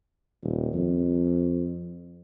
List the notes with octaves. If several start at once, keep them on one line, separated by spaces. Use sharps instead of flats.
D#1
F2